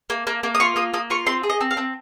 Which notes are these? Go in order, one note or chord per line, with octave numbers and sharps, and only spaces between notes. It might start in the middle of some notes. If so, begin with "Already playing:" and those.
A#3
A#3
A#3
D#6
F4 C#6
A#3 D#6
A#3 D#6
F4 C#6
C4 C6
G#4
D#5
C4
F5
C4